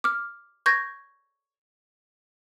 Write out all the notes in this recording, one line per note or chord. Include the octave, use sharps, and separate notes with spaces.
D6 F6
C#6 G6 G#6 A#6